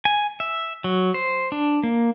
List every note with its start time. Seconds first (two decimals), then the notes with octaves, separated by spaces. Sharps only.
0.05 G#5
0.40 E5
0.84 F#3
1.14 C5
1.52 D4
1.83 A#3